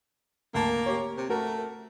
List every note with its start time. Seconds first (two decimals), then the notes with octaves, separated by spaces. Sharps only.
0.54 D2 A#3 A5
0.86 G4 C#5
1.17 C3
1.30 A3 F#4 A#4